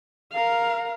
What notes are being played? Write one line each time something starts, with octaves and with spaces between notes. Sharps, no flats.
A#4 F5